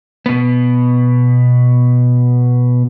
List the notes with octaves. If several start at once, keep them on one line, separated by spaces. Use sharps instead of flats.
B2 B3